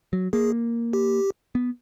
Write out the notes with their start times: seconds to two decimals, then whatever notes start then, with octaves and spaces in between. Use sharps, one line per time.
0.13 F#3
0.33 A#3 G#4
0.93 G4
1.55 B3